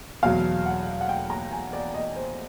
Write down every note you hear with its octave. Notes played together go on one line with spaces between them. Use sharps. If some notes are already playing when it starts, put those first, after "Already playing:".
E2 B2 F#3 F5
F#5
F#5
G5
A#5
G#5
D5
D#5
C5